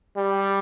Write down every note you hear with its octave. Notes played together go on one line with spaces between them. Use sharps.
G3